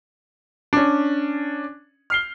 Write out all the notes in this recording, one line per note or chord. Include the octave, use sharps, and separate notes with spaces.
C#4 D4
F6 C7 G7